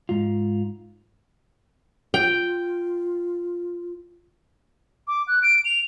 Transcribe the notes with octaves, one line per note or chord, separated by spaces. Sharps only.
G#2 F4
F4 G5
D6
F#6
D7
F7